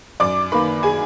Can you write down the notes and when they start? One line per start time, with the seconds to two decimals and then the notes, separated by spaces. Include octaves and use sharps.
0.20 F#2 D5 D6
0.52 D#3 A#3 B4 B5
0.83 G#4 G#5